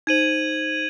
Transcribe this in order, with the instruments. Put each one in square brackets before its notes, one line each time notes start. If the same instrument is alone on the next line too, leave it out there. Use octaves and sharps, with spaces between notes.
[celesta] D#4 C5 [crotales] G#6 D#7 F#7